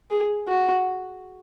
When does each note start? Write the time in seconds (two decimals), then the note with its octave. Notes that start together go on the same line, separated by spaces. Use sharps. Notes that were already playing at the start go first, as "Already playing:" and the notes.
0.11 G#4
0.48 F#4